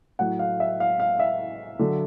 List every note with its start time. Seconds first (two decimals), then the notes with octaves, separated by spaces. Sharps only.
0.19 A2 F#3 F#5
0.39 F5
0.60 E5
0.80 F5
1.00 F5
1.20 E5
1.79 D3 F#3